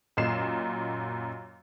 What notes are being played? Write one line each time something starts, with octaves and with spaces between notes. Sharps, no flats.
F#2 A#2 D#5 C7 E7